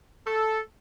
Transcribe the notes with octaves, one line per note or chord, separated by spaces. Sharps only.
A4